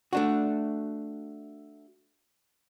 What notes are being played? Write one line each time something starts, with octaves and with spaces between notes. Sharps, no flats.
A3 D4 F#4